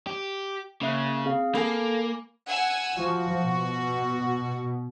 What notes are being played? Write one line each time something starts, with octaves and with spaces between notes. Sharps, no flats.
G4
C#3 A#3 E5 F#6
C4 G#4 F5
A#3 A4 F5 G#5 B5
F#5 G#5 E6
F3 F#4
B2